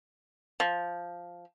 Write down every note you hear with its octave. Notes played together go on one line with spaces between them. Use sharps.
F3